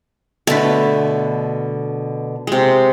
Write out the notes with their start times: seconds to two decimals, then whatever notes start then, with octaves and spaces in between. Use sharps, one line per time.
0.47 B2 D3 A3 B4
2.47 C3 G#3